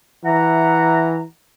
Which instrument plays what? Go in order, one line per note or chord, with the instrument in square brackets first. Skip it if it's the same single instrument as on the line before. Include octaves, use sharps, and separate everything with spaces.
[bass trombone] E3 [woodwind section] E5 F#5 A#5